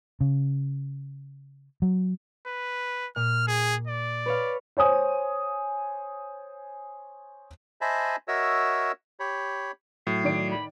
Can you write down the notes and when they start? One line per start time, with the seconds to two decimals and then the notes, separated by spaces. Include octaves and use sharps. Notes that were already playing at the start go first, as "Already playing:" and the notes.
0.21 C#3
1.82 F#3
2.46 B4
3.16 A#2 F6
3.47 G#4
3.87 D5
4.26 B4 C#5 F5
4.77 C5 C#5 G#5 D#6
7.81 C5 D#5 E5 G#5 A5 B5
8.28 F#4 A#4 C#5 D#5 E5 E6
9.20 G4 C#5 B5
10.07 A2 F#3 C7
10.24 D#3 D5 D7
10.50 B5